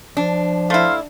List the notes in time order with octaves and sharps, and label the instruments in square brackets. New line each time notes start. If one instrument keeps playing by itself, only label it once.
[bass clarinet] F3 [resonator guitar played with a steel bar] D4
[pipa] A3 E4 [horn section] C5 F5